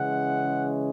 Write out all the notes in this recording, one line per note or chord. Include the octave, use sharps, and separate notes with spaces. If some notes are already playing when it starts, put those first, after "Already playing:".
Already playing: C#3 E3 G#3 C#4 F#5